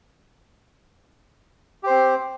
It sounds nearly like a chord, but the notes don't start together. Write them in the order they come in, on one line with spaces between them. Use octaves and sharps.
G4 C5 C4